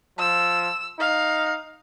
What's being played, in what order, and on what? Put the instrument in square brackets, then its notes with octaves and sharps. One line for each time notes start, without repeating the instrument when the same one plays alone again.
[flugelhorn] F3 [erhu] E6
[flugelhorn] D#4 [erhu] F5